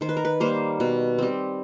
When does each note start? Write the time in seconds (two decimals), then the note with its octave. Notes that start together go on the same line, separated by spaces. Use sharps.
0.01 D#3 C5
0.09 B4
0.17 A#4
0.25 B4
0.40 G3 A#3 C5
0.80 B2
1.18 G3 C4